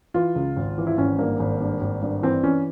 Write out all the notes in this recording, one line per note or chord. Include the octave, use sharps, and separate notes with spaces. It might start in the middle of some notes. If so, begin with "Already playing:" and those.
E3 F4
C#2
G#1
E3
E4
G#1 C#4
G2 A#3
G#1
G2
G#1
G2
E3 C4
E3 C#4